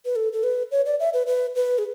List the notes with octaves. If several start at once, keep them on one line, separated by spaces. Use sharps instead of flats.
B4
A4
A4
B4
C#5
D5
E5
B4
B4
B4
G#4